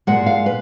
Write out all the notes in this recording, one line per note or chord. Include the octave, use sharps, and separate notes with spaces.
A#2 G#3 F#5
F5
B4